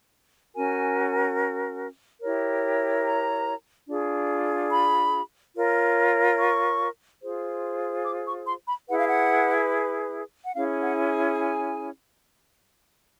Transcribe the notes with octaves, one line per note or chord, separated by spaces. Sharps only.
C#4 F#4 A#4 G#5
E4 G4 A#4 C#5
A#5
D4 F4 G#4
B5
F4 A#4 C#5
C#6
F4 G#4 C5
D6
C#6
C6
B5
E4 G#4 B4 F#5
F5
F#5
F#5
C#4 E4 G#4 F5
F#5
G#5